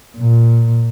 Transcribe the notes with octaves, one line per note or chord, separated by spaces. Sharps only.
A#2